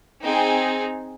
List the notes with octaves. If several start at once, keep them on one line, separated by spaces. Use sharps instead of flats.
C4 D#4 G#4 G5